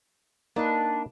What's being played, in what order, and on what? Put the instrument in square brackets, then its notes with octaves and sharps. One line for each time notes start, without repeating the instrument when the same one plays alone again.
[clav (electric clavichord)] A#3 D#4 [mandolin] D4 B4